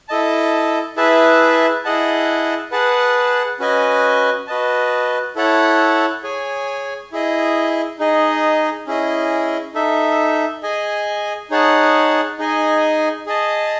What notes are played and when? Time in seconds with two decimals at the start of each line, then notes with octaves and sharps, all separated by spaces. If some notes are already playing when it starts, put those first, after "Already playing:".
0.09 E4 A4 D#5 A5
0.96 E4 G#4 B4 E5 A5
1.84 E4 G#4 D#5 F#5 A5
2.72 G#4 B4 F#5 A5
3.59 C#4 F#4 B4 D#5 G#5
4.47 F#4 B4 D#5 A5
5.36 E4 A4 C#5 F#5 A5
6.23 G#4 C#5 G#5
7.12 E4 G#4 D#5
7.99 D#4 G#4 D#5
8.87 C#4 E4 G#4 D#5
9.74 D#4 A4 E5
10.63 G#4 D#5 G#5
11.50 D#4 G#4 C#5 F#5 A5
12.39 D#4 G#4 D#5 G#5
13.26 G#4 D#5 A5